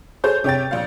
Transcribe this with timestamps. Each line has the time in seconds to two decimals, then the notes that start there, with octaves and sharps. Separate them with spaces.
0.24 G#4 A4 C5 C#5 G6
0.44 C3 C#5 G5 A6
0.71 A#1 F5